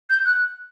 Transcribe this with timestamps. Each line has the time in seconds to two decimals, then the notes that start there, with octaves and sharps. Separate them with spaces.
0.10 G6
0.26 F#6